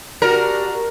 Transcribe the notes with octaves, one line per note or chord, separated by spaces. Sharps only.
D4 F#4 G4 A#4 D5